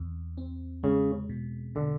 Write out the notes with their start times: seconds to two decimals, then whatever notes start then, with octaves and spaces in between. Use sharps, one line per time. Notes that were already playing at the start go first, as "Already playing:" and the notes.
Already playing: E2 C4
0.37 C4
0.83 C#3 G#3
1.29 B2
1.75 B2 D3